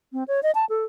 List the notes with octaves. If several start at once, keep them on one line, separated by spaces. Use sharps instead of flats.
C4
C#5
D#5
A5
A4